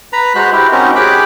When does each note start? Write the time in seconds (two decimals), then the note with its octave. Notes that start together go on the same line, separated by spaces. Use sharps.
0.13 B4 A#5 B5
0.35 G#3 F#4 C5 F#6
0.52 E4 G4
0.72 C4 C#4 D#4 F#4 A#4
0.96 G4 G#4 B5 D6 F#6